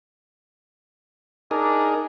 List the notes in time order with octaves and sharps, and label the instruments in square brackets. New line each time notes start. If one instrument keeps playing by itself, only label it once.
[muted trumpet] D4 [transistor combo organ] D#4 G#4 A#4